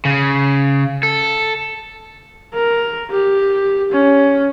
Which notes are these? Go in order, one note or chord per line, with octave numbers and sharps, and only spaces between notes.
C#3
A4
A#4
G4
C#4